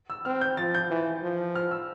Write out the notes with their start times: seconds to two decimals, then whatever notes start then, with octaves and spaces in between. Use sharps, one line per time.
0.10 E6
0.25 C4 F6
0.41 G6
0.57 F3 A6
0.75 G6
0.91 E3
1.22 F3
1.55 F6
1.71 E6